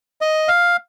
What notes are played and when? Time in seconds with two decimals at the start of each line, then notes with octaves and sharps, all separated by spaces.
0.21 D#5
0.48 F5